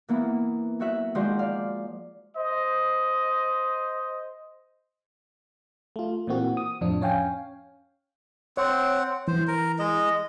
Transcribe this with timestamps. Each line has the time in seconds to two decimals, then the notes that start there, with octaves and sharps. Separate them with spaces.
0.08 E3 A#3 B3 E4
0.80 F#3 F#4 E5 F#6
1.15 D#3 F3 G#3 F#4 C5 D5
1.39 D5 F5
2.36 C5 D#5
5.96 A3 F4
6.27 A#2 E3 A#3 C4 F#4
6.57 D#6
6.81 F2 A2 F3 D4
7.01 C#4 C#5 F5 G5 G#5
8.57 C4 C#5 F#5
9.28 E3 C5
9.47 A#4
9.79 G#3 D#5